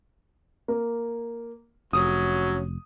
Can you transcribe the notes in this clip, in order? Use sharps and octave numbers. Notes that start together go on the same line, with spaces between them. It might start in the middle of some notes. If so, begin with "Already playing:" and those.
A#3
F1 F#3 C#4 D#6